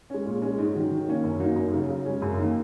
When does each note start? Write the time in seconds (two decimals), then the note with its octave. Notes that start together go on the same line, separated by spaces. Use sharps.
0.10 G#3 C#4
0.26 A#2
0.42 G#3 C#4
0.58 G#2
0.75 D#3 F#3
0.91 D#3
1.08 A#3 C#4
1.24 F#2
1.40 F#3 A#3 D#4
1.56 F#2
1.73 C#3
1.78 F#3
1.89 C#3
2.05 G#3 C#4
2.22 F#2
2.38 D#3 A#3 D#4